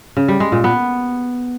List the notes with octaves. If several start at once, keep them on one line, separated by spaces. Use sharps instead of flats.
C#3
G3
G#3
A#2
B3